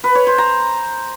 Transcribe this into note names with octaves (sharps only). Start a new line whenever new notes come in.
B4
C#5
C5
A#5